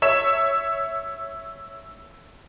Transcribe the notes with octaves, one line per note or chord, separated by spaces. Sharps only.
C#5 E5 E7